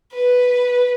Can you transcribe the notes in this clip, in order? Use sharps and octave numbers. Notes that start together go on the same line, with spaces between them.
B4